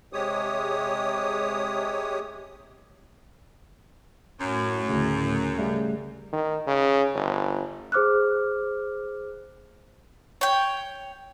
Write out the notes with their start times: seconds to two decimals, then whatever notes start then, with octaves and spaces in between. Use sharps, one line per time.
0.13 C3 G#3 G4 C#5 D#6
4.40 F#2 A2
4.89 D2 C#3
5.58 C#3 G3 A3
6.33 D#3
6.67 C#3
7.14 G1
7.92 G#4 C5 D6 F6 F#6
10.41 C#5 G5